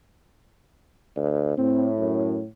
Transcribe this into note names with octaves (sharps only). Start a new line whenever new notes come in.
D2
A2 C4
F#2